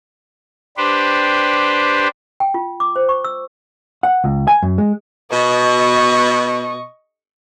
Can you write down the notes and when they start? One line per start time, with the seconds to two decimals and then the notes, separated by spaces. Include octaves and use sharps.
0.77 D4 G4 B4 C5
2.40 G5
2.54 F4
2.80 D6
2.96 C5
3.09 C#6
3.24 E6
4.03 F#5
4.24 C#2
4.48 G#5
4.62 F#2
4.78 G#3
5.31 B2 D#5 C#6